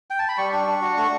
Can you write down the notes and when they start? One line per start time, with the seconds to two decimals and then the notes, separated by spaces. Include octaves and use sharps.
0.10 G5
0.19 A5
0.28 B5
0.38 G3 C#6
0.52 D4 C#6
0.67 D4
0.82 F#4
0.97 A3 C#6